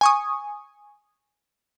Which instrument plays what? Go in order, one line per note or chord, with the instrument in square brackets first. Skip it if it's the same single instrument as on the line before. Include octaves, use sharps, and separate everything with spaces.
[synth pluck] G#5 C#6 D#6